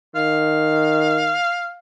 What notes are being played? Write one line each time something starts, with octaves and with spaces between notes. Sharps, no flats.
D#3 F5